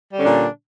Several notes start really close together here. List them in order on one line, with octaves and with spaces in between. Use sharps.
G3 D3 C#4 D4 A#2